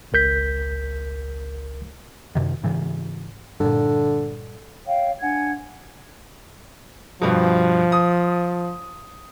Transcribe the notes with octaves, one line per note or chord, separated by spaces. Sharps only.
G#1 C#2 A#4 G6 B6
F#2 C3 D#3
G#2 C#3 E3
G2 A#2 D3
C#5 F5 G5
D4 F#5 G#5 G#6
G2 B2 F3
D#6